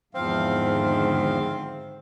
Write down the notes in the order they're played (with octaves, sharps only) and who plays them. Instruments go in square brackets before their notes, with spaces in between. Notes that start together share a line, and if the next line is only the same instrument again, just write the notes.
[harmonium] E2 F3 F5 [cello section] G#2 D3 D#3 [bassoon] C4